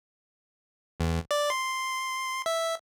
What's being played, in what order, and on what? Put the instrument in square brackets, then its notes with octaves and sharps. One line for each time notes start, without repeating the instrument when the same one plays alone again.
[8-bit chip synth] E2
D5
C6
E5